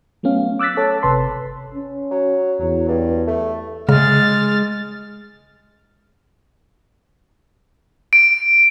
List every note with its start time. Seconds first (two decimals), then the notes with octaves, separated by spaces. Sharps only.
0.23 F#3 A3 B3 C#4 F5
0.59 D6 E6 F#6 A6 B6
0.77 A4 C#5 A5
1.03 G1 C3 B4 A5 C6
1.74 C#4
2.11 F#3
2.60 E2 F#3
2.89 G2
3.27 A3
3.89 C#3 G#3 F6 A6
8.13 D7